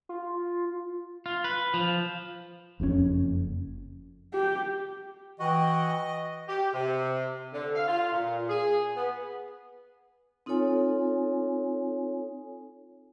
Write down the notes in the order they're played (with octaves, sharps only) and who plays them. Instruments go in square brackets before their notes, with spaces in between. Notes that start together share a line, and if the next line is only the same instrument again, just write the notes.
[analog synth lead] F4
[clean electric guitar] F4
B4
F3
[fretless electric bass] F#1 F2 A2 C#4
[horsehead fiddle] G4
[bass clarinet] E3 [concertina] F#4 [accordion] D#5 [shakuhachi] G5
[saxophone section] G4
C3
D3
F5
F4
A#2
G#4
B3
[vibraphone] C4 D#4 F4 A4 C#5 G#5